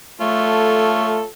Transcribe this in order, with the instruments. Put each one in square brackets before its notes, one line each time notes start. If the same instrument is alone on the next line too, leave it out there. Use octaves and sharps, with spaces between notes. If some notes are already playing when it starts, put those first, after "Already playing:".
[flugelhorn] A3 [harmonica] F4 A4 C#5